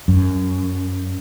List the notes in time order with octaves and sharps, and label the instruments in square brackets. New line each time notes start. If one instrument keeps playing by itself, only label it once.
[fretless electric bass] F#2